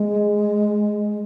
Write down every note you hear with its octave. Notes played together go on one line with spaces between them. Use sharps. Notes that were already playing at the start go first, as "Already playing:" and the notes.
Already playing: G#3